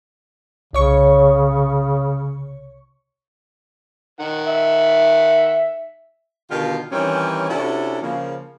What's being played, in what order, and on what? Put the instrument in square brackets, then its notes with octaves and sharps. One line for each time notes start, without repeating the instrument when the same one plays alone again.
[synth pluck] C2 C#5 C#6 [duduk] C#3
[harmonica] D#3 F#5
[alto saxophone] E5
[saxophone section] B2 D3 D#3 F4 G4 F5
D#3 E3 G3 C4 C#4
C3 C#4 D4 E4 F#4 A4
C#3 F3 A#3